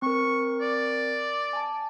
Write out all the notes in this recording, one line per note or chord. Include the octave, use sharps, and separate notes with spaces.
C4 A#4 C#6
D5
G#5 A5